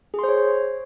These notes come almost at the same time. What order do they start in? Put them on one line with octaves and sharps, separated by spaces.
G#4 C6 C5 C#5